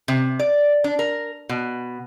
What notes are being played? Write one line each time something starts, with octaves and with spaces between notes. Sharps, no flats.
C3
D5
D4
A#4
B2